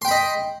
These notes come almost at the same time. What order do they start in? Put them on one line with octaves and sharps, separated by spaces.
C6 G5 B5 D#5